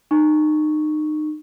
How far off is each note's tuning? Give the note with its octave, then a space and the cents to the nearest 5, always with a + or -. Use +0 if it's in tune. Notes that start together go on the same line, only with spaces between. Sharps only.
D#4 -30 C#6 +0